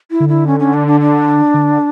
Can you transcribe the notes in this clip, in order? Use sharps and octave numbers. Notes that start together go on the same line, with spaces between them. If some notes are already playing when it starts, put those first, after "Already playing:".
E4
D3
E4
C#4
C#4
D4
D4
D4
D3